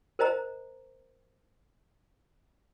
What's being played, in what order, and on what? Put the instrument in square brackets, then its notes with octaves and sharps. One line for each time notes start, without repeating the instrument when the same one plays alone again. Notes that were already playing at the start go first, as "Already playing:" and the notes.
[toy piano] A#4 C5 D#5 A#5